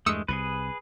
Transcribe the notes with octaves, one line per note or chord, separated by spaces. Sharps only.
E2 G2 G#3 A3 D#6 E6 C#7
C2 C3 G#4 B4